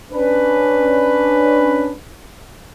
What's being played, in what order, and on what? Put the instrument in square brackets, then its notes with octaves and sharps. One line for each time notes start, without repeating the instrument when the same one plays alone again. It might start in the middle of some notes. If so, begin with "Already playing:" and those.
[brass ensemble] C#4 D4 B4